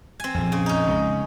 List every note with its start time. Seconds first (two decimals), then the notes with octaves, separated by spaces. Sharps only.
0.20 C4 G#5
0.35 A#1 F2
0.52 C#3
0.66 C#4 D#4
0.87 C#3 G#3